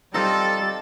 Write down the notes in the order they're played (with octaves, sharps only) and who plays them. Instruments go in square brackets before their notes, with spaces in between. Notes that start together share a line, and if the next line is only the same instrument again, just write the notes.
[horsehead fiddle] G3 [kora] C4 D#4 F4 [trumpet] A4 [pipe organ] A6